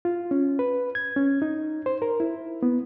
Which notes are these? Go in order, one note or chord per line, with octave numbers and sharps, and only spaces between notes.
F4
C#4
B4
G#6
C#4
D#4
C5
A#4
E4
B3